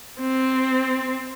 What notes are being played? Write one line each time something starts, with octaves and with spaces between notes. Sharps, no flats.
C4